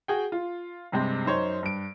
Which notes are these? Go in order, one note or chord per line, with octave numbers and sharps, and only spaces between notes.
F#4 G#4 G5
F4
G2 C3 G#3 C4
F#2 D#4 C5 C#5
G2 D7